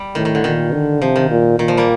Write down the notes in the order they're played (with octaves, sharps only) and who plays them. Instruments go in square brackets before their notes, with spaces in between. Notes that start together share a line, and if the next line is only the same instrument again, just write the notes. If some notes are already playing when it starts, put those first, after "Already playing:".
Already playing: [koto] G3
[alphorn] A2 [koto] D#3
[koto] D#3
D3
[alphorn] A#2 [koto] D#3
[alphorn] D3
[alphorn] C3 [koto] F3
[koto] D#3
[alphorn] A#2
[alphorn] A#2 [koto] D#3
[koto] F3
G3 A#3